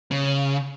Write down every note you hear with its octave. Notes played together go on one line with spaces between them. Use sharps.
C#3